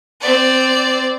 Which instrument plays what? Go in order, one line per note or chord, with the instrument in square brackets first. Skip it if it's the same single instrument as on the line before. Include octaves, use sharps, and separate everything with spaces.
[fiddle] C4 D5